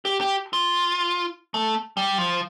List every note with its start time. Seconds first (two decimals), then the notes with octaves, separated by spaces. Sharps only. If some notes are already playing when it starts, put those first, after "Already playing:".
0.05 G4
0.21 G4
0.53 F4
1.54 A3
1.97 G3
2.18 F3